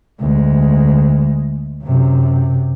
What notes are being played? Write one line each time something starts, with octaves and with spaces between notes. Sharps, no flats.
D2 G#3
F#2 C3